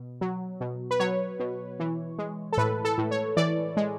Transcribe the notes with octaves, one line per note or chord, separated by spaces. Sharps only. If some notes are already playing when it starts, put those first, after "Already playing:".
Already playing: B2
F#3
B2
B4
F#3 C#5
B2
E3
G#3
A4
A2 B4
A4
A2
C#5
E3 D5
G#3